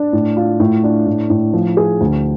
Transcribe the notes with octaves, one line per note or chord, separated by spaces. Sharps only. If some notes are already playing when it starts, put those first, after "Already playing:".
Already playing: D4
A2
F4
A2
D4
A2
A2
F3
G#4
D2